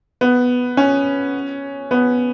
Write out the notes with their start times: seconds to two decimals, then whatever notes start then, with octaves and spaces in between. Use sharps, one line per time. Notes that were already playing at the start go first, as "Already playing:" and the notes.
0.21 B3
0.77 C#4
1.91 B3